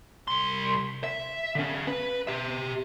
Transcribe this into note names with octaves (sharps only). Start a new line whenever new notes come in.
C2 C6
E5
D3 C#4
B4
G4 E5